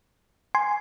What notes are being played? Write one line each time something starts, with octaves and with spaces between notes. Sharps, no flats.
G#5 C6